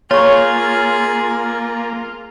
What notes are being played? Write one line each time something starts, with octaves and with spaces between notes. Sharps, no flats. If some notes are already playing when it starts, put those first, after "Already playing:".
A#3 F4 G#4 C#5 C#6